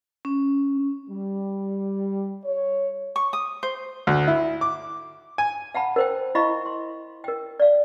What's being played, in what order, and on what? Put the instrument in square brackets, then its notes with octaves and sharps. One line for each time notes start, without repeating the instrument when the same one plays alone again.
[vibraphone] C#4
[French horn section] G3
C#5
[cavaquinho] C#6
D#6
C5
[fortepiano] D2
E4
D6
G#5
[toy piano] F5 F#5 A5 B5
A#4 C5 G5
E4 D#5 F5 B5 C#6
C6
A#4 G5
D5 F5